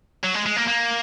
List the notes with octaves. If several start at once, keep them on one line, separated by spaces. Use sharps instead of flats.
F#3
G#3
G#3
A#3
A#3